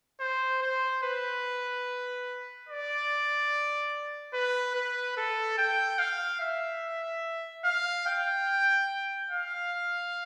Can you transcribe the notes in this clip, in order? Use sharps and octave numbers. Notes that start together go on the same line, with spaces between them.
C5
C5
B4
D5
B4
B4
A4
G5
F5
E5
F5
G5
F5